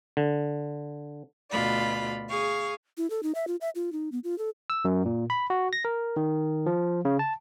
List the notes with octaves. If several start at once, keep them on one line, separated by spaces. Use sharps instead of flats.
D3
D2 B2 F4 D5 B5
G#4 F5 C#6
E4
A4
D#4
E5
F4
E5
F4
D#4
B3
F4
A4
E6
F#2
A#2
B5
F#4
A#6
A#4
D#3
F3
C#3
A5